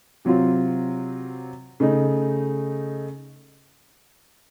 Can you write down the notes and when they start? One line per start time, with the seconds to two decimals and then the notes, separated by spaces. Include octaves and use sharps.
0.25 C3 F#3 C4 F4
1.80 C#3 A3 D#4